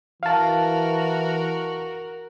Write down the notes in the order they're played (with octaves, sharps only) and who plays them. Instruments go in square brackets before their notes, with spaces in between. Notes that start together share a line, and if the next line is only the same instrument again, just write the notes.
[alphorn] E3 [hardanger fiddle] F#4 A#4 [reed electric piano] F5 A5